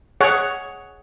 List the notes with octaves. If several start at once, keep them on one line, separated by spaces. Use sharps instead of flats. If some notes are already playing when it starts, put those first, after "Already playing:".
G#4 C#5 F#5